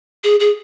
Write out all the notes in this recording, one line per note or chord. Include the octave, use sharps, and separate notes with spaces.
G#4
G#4